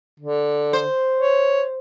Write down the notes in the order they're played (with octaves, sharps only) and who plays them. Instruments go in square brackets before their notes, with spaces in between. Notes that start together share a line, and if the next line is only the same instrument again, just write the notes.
[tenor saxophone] D3
[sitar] C5
[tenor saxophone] C#5